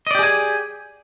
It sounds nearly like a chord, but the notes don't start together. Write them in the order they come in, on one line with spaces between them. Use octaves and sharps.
D#5 D5 G4 G#4 G#5